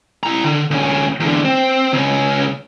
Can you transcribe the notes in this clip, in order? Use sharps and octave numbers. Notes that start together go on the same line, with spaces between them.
E4 A#5
D3
D2 C#4
E2 D3
C4
C#2 C#4